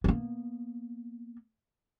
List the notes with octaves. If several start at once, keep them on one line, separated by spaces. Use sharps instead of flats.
A#3 B3